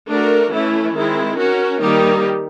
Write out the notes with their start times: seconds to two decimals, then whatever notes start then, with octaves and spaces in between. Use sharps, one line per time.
0.08 A3 D4 F#4 A#4
0.52 E3 A3 C#4 E4
0.95 D#3 G#3 C4 E4
1.37 C#4 F#4 A#4
1.81 D#3 G3 A#3 D#4 G4